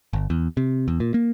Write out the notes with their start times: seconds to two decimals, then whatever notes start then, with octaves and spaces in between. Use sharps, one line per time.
0.13 G1
0.30 E2
0.57 C3
0.88 E2
1.00 A#2
1.14 A#3